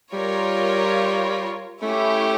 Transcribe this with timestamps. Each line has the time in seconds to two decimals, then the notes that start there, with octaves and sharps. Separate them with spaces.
0.13 G3 F4 A#4 C#5
1.82 A3 C#4 E4 G4